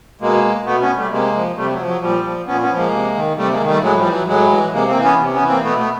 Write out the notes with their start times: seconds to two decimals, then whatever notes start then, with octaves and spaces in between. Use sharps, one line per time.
0.20 B2 G#3 A#3
0.65 B2 A3 B3
0.81 B3 C#4
0.97 G3 A3
1.11 C3 G#3 A#3
1.34 F3
1.56 C3 G3 A3
1.71 F#3
1.79 F3
1.87 F#3
2.01 A#2 F3 G3
2.24 F3
2.46 A#2 B3 C#4
2.62 B3 C#4
2.69 F3
2.77 G#3 A#3
2.92 C3
3.15 D#3
3.37 C3 G3 A3
3.52 G#3 A#3
3.60 D#3
3.67 G3 A3
3.82 A2 F#3 G#3
3.97 F3 G3
4.05 E3
4.12 F#3
4.27 A2 F#3 G#3
4.50 E3
4.73 C3 G#3 A#3
4.88 A#3 C4
4.96 E3
5.04 B3 C#4
5.19 C3
5.33 B3 C#4
5.42 E3
5.48 A#3 C4
5.63 B2 A3 B3
5.78 A3 B3